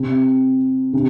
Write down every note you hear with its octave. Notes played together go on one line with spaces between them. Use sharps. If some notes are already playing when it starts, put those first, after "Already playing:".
Already playing: C3
C3